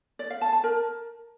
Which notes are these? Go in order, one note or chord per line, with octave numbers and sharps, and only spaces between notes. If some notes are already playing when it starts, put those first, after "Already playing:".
D5
F5
A5
A5
A#4